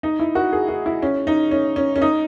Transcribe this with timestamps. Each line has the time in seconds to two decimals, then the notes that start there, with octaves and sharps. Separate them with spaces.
0.03 D#4
0.20 E4
0.35 F#4
0.53 G#4
0.68 F#4
0.86 E4
1.02 C#4
1.27 D#4
1.51 C#4
1.76 C#4
1.96 C#4
2.02 D#4